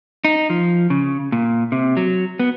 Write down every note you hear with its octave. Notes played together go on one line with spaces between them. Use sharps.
D#4
F3
C#3
A#2
C3
F#3
B3